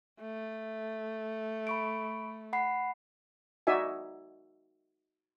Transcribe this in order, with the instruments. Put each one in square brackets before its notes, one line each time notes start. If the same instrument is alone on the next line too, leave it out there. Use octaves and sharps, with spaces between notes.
[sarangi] A3
[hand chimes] B5 C#6 D7
F#5 B5 C7
[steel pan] D#4 F#4 D5 E5 G#5